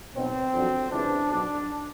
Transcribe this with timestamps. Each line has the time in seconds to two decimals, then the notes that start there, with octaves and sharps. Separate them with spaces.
0.15 B1 B2 F#3 C4
0.54 F2 D3 F#3
0.91 C#2 C3 E3 D4
1.29 B1 B2 F#3 D4